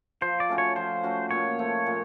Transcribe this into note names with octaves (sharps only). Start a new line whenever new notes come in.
F3 C5
D5
A3 C#4 F#4
C#5
F3 C5
A3 C#4 F#4
A#2 C#5
F3 A3
A#2